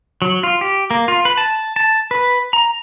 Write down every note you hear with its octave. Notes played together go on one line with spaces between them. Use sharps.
F#3
F4
G4
A#3
F4
B4
A5
A5
B4
A#5